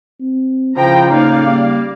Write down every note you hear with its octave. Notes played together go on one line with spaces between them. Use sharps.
C4
C#3 F3 E4 G5 A#5
A2 A#3 D#4 D5 F5
G3 A#3